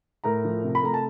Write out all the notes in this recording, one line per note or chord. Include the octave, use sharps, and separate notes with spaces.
A2 A#4 A#5
F3
C3
B5
A3 A#5
A5